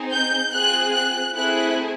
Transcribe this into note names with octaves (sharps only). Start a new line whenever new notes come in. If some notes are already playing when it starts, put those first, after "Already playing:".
Already playing: C4 D#4 G#4
G6
C4 F4 G#4 F#6
F#6
A3 C4 E4 G#4 F#6